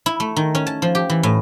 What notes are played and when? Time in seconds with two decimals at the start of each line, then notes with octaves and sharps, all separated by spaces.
0.06 E4
0.20 A3
0.36 D#3
0.55 C#4
0.67 A5
0.82 F3
0.95 G4
1.10 E3
1.23 A2